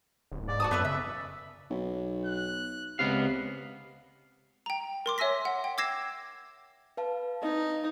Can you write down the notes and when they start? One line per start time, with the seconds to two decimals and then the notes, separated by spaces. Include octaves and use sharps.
0.32 D1
0.48 G#2 D5
0.60 F#4 A5 D#6
0.71 F#2 B3 B4 E5
0.85 C#3 E5
1.71 B1
2.26 F#6
2.99 C#2 C3 B3 D#5 F5
4.66 G5 A#5
5.06 A#4 C6 D6
5.18 C#5 E5 G#5 E6 A#6 B6
5.45 F#5
5.64 G5
5.78 D6 E6 G#6 A#6 C7 E7
6.97 B4 F5 A5
7.43 D#4 D#5